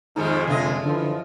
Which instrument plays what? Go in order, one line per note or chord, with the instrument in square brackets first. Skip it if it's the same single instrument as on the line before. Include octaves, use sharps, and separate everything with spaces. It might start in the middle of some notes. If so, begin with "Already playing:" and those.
[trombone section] F2 G#3 [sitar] G#2 D#3 G3 [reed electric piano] D#4
[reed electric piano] C2 D3 C4 [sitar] F#2 F4 D#5
[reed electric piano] D3 [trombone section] E3 F3